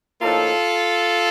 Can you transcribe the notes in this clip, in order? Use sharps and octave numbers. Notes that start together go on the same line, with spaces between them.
A2 F3 A#3 D#4 F4 A4